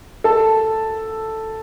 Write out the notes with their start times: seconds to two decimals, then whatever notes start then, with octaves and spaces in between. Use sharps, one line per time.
0.24 A4 A5